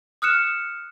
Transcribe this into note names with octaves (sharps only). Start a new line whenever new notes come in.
D#6 F6 F#6 C#7 E7